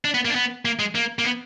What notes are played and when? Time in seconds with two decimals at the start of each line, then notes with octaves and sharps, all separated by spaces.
0.05 D4
0.14 B3
0.25 A#3
0.30 D4
0.35 B3
0.65 A#3
0.79 G#3
0.95 A#3
1.19 A#3
1.24 B3